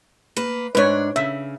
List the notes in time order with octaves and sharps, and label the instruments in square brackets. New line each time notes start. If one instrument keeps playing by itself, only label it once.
[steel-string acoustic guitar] A#3 B4
[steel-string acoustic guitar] G#2 D4 [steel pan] B4 C#5
[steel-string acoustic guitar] C#3 [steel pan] E5